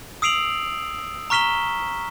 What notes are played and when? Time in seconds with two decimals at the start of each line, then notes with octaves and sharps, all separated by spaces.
0.22 D#6 E6 C7 D7 F7 F#7
1.30 A#5 C#6 F6 B6 E7 G7